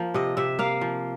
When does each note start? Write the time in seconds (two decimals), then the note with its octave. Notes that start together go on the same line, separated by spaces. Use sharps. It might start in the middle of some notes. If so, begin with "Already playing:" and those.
Already playing: F3 A#3
0.14 C3 D#5
0.37 C3 E5
0.59 A#3 F5
0.81 F3